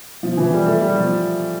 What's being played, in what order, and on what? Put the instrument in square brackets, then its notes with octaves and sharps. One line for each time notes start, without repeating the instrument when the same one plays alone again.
[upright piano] F3
E3
G3
A3
G3
F3